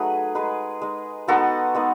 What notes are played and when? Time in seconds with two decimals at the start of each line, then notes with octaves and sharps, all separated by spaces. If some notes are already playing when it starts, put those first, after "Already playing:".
Already playing: F#3 A3 D#4 G#4 B4
0.35 G#3 D#4 G#4 B4
0.82 G#3 D#4
1.28 G#3 B3 D#4 F#4 A4
1.75 G#3 B3 D#4